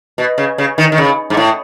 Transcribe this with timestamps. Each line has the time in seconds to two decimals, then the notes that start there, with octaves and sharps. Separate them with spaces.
0.18 B2
0.38 C#3
0.58 C#3
0.78 D#3
0.92 D#3
0.98 C#3
1.30 G#2
1.37 A2